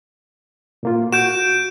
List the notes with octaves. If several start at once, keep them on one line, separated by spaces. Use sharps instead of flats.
A#2 A#3 F4
F#4 G6 D7 E7